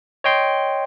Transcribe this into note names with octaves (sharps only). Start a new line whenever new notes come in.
C#5 D#5 G5 C6